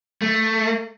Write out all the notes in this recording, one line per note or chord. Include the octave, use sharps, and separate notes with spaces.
A3